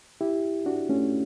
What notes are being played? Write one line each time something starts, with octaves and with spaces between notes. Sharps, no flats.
E4 G4
D4 F#4
A3 C#4